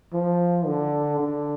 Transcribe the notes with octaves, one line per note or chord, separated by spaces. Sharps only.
F3
D3
D3